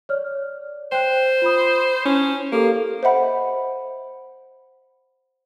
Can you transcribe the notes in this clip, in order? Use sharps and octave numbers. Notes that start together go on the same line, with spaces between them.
C#5 D5 F6
C5 G5 F#6
F4 B5 D#6
C#4 E4
A#3 G4 A4 F5
C5 D#5 E5 F#5 B5